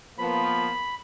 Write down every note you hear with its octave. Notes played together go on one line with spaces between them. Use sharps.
F3 A#3 B3 B5